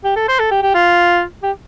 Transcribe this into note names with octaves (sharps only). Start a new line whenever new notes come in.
G4
A4
C5
A4
G4
G4
F4
G4